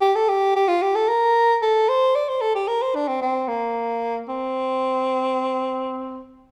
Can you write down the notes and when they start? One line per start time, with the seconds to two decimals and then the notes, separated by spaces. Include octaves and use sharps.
0.01 G4
0.15 A4
0.29 G4
0.56 G4
0.68 F4
0.82 G4
0.95 A4
1.08 A#4
1.62 A4
1.89 C5
2.15 D5
2.29 C5
2.41 A4
2.55 G4
2.68 A#4
2.82 C5
2.95 D4
3.08 C4
3.22 C4
3.48 A#3
4.28 C4